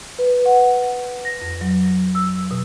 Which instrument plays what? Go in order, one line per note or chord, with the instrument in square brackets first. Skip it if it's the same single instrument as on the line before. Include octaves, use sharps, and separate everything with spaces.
[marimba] B4
F#5
A#6
F2
F#3
E6
B2